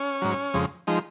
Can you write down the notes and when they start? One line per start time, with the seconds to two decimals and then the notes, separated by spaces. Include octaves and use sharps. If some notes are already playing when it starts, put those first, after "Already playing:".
Already playing: C#4
0.22 G#2 F#3
0.54 F2 C#3 G#3
0.87 F3 G#3 D#4